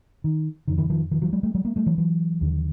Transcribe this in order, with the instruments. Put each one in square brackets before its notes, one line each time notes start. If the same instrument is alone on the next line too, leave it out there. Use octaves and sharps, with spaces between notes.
[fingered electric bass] D#3
F2 D3 D#3
D3 E3
D#3 F3
D#3 F3
E3 F#3
F#3 G#3
G3 A3
F#3 G#3
G#3 A#3
G3 A3
E3 F#3
E3 F#3
D#2 D3